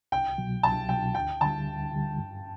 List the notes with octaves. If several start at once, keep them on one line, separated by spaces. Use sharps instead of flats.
C2 G5
B2 F#3
C2 A5
B2 F#3 G5
D2 G5
D3 G3 A5
D2
D3 G3
G2